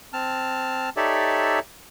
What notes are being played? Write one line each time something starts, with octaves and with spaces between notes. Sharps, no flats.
C4 A5 F6
D#4 G4 A4 C#5 D5 E5